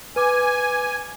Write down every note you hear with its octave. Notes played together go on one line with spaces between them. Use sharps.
B4 G#5 D6